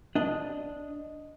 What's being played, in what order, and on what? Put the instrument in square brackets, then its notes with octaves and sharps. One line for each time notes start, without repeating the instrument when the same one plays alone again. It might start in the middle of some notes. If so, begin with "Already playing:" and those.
[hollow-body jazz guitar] D4 D#5